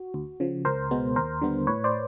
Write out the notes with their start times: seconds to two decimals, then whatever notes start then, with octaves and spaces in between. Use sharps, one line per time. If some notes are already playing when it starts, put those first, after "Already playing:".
Already playing: F#4
0.14 D2
0.40 C#3 F3
0.65 C#2 A#4 C5
0.91 B2 G#3 B3
1.16 D#2 A#4 C5
1.41 D3 G3 B3
1.67 A2 B4 C#5
1.84 C5 D5